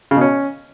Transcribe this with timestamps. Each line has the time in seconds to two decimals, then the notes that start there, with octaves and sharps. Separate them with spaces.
0.11 C#3
0.16 B2
0.21 C#4